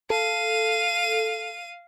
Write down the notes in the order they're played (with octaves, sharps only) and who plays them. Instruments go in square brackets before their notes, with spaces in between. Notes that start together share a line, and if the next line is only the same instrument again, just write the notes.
[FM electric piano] A4 [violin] F5 D#7